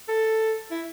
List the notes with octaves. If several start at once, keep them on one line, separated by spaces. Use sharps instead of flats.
A4
E4